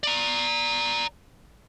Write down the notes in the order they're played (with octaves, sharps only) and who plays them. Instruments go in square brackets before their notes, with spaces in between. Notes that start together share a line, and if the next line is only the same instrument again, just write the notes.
[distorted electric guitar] D5 A#5